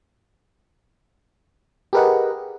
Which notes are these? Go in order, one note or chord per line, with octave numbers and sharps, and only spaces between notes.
G4 G#4 A#4 B4 D#5 F#5